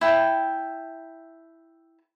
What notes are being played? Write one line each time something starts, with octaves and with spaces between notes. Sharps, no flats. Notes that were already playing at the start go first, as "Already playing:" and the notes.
E4 G5 A5